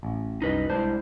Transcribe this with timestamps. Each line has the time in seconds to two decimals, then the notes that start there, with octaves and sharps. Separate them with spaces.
0.03 A1
0.42 C2 F#2 D#4 B4 D#5
0.70 C2 G#3 D4 E4 C5